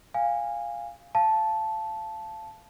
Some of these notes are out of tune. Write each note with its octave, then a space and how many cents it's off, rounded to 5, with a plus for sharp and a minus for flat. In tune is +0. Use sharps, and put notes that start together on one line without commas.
F5 +0 G#5 -20
F5 -20 A5 -10